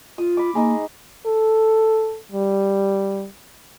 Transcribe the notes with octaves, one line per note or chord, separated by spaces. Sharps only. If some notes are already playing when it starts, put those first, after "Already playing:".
F4 D#6
B5 D6
G#3 A#3 D#4
A4
G3